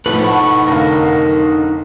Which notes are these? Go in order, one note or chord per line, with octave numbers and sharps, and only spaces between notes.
A2 F3 D#4 A4 B4
F#5 A5 B5 C#6
F1 D3 A#4 D#5 F5